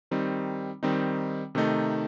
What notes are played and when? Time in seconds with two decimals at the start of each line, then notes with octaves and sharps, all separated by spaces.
0.11 D#3 G3 C4 D#4
0.83 D#3 G3 C4 D#4
1.55 C3 D#3 A3 D#4